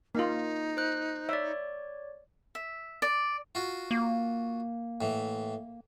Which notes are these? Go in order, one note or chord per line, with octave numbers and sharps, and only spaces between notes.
A#3 D#4 F4
C5 F#6
C#5 D5 E5
E5
D5
F4 F#4
A#3
A2 E3